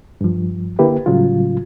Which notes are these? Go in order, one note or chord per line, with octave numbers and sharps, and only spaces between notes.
G2 F3
D3 A#3 E4 G4 B4
A2 C#3 F#3 G3 F4